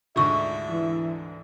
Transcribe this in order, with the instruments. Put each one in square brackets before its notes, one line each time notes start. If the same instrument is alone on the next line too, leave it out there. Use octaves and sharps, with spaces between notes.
[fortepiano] D2 G#2 D3 [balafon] F4 C#6 [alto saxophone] E5
[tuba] E3